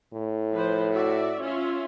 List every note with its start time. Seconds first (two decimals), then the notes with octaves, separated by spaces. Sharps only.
0.14 A2
0.52 F3 B4 C5
0.92 F#4 D5 E5
1.41 C#4 F4 E5